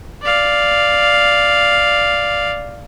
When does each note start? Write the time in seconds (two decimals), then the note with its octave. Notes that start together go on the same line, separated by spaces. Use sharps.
0.23 D5 F5